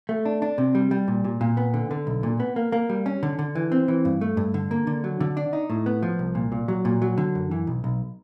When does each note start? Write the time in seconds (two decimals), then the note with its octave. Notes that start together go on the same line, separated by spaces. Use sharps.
0.09 A3
0.26 D4
0.42 D4
0.58 C3
0.75 G3
0.91 G3
1.08 A#2
1.24 A#2
1.41 A#2
1.57 B3
1.74 D3
1.91 D3
2.07 B1
2.23 A#2
2.40 B3
2.56 A#3
2.72 A#3
2.90 G3
3.06 C#4
3.23 D3
3.39 D3
3.55 E3
3.72 C4
3.88 E3
4.05 G2
4.21 A3
4.37 G2
4.54 D3
4.71 A#3
4.87 D3
5.04 F#3
5.21 D3
5.37 D4
5.53 D#4
5.70 A2
5.86 B3
6.03 F3
6.19 C2
6.35 A#2
6.52 A#2
6.68 F#3
6.85 A#2
7.02 F#3
7.18 D3
7.35 F#2
7.51 E3
7.67 B1
7.84 B1